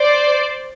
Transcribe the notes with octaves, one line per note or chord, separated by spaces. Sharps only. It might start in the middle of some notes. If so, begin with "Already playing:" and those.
Already playing: C5 D5